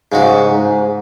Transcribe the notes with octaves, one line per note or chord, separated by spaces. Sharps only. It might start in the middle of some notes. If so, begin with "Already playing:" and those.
G#2 C#3 G#3 F#4
G#2